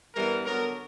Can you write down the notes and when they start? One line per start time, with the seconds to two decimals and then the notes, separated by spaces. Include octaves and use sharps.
0.14 G2 E3 G3 B3 A#4
0.45 D3 F#3 B3 A#4